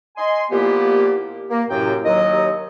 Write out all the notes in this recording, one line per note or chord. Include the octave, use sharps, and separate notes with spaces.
D#5 G#5 C6
A#2 F3 A#3 B3 E4 G4
A#3
F#2 A2 C3 G5
D#2 F#3 D#5